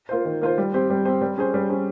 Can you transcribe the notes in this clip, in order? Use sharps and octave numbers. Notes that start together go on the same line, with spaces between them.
A#3 F4 C5
D#3
A#3 F4 C5
G3
C4 G4 C5
G3
C4 G4 C5
G3
C#4 G#4 C5
G3
C#4 G#4 C5